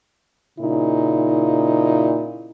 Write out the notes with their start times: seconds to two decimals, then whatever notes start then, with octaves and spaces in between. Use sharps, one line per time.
0.59 A#2 C#3 D#4 E4